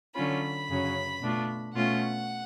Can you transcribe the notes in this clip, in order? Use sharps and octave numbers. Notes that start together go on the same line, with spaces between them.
D3 F#3 C#4 F4 B5
F#2 C#3 F#3 C#4
B2 A3 D4 F4
B2 A3 C#4 F4 F#5